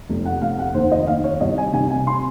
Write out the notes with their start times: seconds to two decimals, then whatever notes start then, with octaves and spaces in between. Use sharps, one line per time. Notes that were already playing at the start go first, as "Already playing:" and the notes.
0.09 F1
0.25 F#5
0.41 F1 F5
0.59 F#5
0.74 D#2 C5
0.92 D#5
1.07 D#2 F5
1.24 C#5
1.41 C2 D#5
1.58 G#5
1.73 C3 G#5
1.90 G#5
2.07 C6